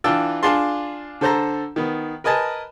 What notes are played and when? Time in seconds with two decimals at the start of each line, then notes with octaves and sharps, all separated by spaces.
0.04 E3 D4 F4 G5 A5 E6
0.43 D4 F4 G#4 A5 C6
1.21 D3 A4 C5 A5 A#5
1.76 D#3 B3
2.24 A#4 B4 D#5 G#5 A5